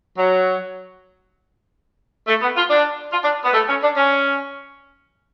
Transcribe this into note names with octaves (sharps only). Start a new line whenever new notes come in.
F#3
A3
B3
F4
D4
F4
D4
B3
A3
C#4
D4
C#4